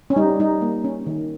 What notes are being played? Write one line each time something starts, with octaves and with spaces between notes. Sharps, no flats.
C#4
G3 D#4
G3 D#4
A#3
C#4
D#3